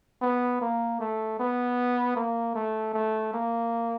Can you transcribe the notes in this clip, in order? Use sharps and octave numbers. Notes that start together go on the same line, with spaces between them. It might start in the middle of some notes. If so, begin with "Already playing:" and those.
B3
A#3
A3
B3
A#3
A3
A3
A#3